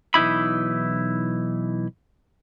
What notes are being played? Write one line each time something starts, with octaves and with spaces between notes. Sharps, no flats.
B1 E3 D#4 E4 B5